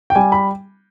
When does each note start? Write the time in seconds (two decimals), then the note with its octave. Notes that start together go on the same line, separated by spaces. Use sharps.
0.10 G5
0.15 G3 G#5
0.32 B5